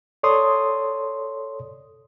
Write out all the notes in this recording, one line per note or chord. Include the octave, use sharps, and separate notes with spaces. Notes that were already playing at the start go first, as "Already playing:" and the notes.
A4 C#5 D5 C6 D#6